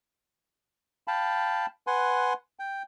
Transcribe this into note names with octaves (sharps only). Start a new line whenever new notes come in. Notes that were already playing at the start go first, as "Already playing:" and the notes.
F5 G5 A5 B5
B4 F#5 G#5 C6
G5